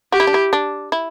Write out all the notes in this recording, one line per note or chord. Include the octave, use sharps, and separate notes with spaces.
F#4 G4
E4
D4
E4
D4
E4